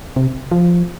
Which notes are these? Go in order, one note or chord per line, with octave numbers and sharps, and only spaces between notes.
C3
F3